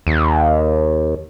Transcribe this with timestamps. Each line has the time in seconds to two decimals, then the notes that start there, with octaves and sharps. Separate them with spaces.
0.07 D#2